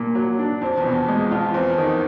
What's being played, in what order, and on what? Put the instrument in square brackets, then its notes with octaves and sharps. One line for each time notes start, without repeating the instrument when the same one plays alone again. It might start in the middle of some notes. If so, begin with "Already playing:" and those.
Already playing: [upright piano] G2 [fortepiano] A#2
[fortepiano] F#3
D4
[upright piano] F2 [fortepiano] C4
[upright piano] E2
[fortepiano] B2
[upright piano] F2
[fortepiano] G#3
[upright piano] F2 [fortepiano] F4
[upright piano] E2 [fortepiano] C4
[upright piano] F2
[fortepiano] D#3